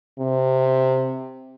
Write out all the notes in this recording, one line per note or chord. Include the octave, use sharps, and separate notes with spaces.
C3